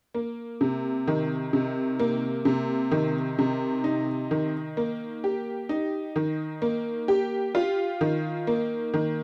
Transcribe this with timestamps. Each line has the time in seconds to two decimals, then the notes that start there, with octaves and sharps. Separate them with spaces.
0.14 A#3
0.61 C3
1.08 D#3
1.53 C3
1.99 A#3
2.45 C3
2.91 D#3
3.39 C3
3.84 D#4
4.31 D#3
4.77 A#3
5.24 G4
5.69 D#4
6.16 D#3
6.62 A#3
7.08 G4
7.55 F4
8.01 D#3
8.47 A#3
8.94 D#3